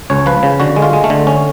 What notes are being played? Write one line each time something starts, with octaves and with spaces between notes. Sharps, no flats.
C#2 C#5
F3 B4
C#3
D3 F#4
G#3
F4
G#3
A3
D3
C#4